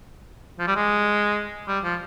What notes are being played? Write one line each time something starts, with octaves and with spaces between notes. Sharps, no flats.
F3
G3
G#3
G3
F3